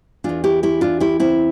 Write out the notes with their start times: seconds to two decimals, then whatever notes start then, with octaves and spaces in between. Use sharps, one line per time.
0.24 E2 E3 D4 F4
0.44 E4 G4
0.63 E4 G4
0.81 D4 F4
1.00 E4 G4
1.20 C4 E4